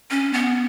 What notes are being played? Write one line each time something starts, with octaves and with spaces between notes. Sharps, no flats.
C#4
B3